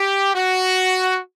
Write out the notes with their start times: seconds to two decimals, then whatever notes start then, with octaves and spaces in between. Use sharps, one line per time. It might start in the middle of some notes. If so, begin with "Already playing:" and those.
Already playing: G4
0.34 F#4